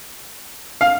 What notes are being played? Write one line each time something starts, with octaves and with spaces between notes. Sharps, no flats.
F5